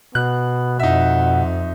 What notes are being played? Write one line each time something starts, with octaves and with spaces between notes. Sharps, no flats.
B2 B3 F#6
F2 D#4 E5 F#5